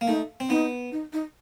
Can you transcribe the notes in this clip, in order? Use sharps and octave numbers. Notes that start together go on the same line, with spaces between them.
A#3
A3 D#4
C4
B3 D#4
D#4
D#4